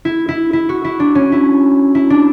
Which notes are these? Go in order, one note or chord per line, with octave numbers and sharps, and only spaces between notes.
E4
E4
E4
F#4
E4
D4
C#4
E4
E4
D4